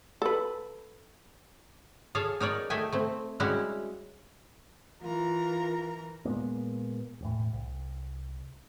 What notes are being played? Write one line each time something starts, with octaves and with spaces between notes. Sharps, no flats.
A4 B4
G#4 A4 C#5 F5 A5
D#4 A#4 C#5 D5
A3 D#4 A4 E5 G5 G#5
A3 C4
G3 G#3 C#4 E4 F#4 G4
E3 F4 A#4 A#5
A#2 G#3 A#3 B3
E1 A2
C2